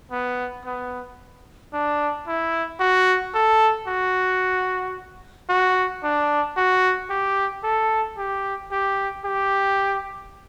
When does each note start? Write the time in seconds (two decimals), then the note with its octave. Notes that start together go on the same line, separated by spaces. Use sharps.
0.11 B3
0.65 B3
1.73 D4
2.27 E4
2.80 F#4
3.34 A4
3.87 F#4
5.49 F#4
6.03 D4
6.57 F#4
7.10 G4
7.64 A4
8.18 G4
8.72 G4
9.25 G4